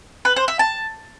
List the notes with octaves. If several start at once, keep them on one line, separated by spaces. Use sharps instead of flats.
B4
C5
E5
A5